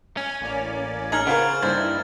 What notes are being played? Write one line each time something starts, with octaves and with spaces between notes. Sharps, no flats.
C#4 G#5
A1 A#3 D5
G#3 D#4 F6 G#6 F#7
C#3 B3 F4 A#4 C5 A6
G2 A#3 D#4 E4 C5 A6